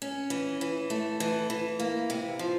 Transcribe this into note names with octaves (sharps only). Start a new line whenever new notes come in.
C#4
E3
E3
A3
E3
E3
A#3
C3
F3